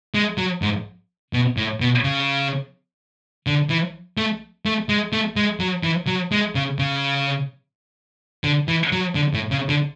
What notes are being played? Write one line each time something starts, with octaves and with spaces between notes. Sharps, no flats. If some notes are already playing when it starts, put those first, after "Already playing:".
G#3
F#3
G#2
B2
A2
B2
C#3
D3
E3
A3
A3
G#3
A3
G#3
F#3
E3
F#3
G#3
C#3
C#3
D3
E3
F#3
D3
A2
C#3
D3